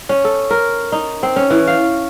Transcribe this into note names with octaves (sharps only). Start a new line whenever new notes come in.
C#4
A4
A#4
D#4
C4
C#4
E3
F5